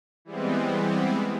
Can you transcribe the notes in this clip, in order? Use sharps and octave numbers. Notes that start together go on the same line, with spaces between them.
E3 G3 G#3 B3 C4